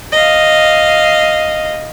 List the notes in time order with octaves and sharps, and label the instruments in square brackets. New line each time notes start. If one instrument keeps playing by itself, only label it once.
[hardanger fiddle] D#5 F5